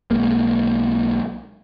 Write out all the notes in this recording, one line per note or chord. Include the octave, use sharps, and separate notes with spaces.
B1 G#3 A#3